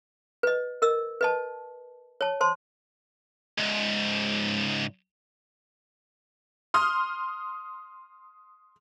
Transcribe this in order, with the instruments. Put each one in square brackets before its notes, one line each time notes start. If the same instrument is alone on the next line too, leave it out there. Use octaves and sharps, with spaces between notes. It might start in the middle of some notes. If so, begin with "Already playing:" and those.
[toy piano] B4 D#5
A#4 D#5 E6
B4 D#5 A5
C#5 A5
C5 A5 C6
[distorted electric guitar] C#2 G#2
[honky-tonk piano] C6 D#6 F6